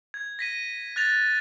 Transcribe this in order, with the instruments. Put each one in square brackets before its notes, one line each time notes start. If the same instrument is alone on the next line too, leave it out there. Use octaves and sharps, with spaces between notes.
[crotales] G#6
A#6 B6 D#7
F#6 A6 A#6 F7